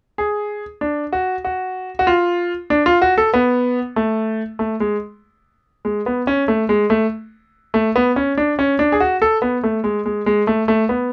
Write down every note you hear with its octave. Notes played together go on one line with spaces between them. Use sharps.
G#4
D4
F#4
F#4
F#4
F4
D4
F4
F#4
A4
B3
A3
A3
G#3
G#3
B3
C#4
A3
G#3
A3
A3
B3
C#4
D4
C#4
D4
G#4
F#4
A4
B3
A3
G#3
G#3
G#3
A3
A3
B3